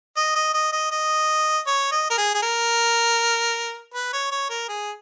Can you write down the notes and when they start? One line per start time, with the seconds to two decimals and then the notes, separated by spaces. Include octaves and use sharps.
0.17 D#5
0.35 D#5
0.54 D#5
0.72 D#5
0.91 D#5
1.67 C#5
1.92 D#5
2.10 A#4
2.18 G#4
2.34 G#4
2.42 A#4
3.94 B4
4.13 C#5
4.31 C#5
4.50 A#4
4.69 G#4